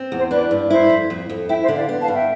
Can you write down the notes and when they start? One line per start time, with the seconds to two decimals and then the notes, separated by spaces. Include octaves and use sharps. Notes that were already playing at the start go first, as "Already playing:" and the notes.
Already playing: C4
0.12 E2
0.17 C5
0.30 D4 B4 D5
0.51 G2
0.70 E4 C5 E5
0.89 F2
1.10 F2
1.29 F2
1.49 E4 E5 G5
1.63 C5 E5
1.68 D3
1.75 D5 F5
1.89 B3
2.01 F5 A5
2.08 G2
2.14 E5 G5